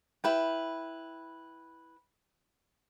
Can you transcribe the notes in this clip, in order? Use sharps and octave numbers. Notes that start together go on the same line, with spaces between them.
E4 B4 G5